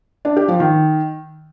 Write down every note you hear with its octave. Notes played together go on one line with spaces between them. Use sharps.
D4
G4
F3
D#3